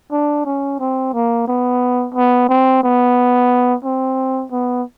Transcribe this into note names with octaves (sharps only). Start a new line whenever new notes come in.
D4
C#4
C4
A#3
B3
B3
C4
B3
C4
B3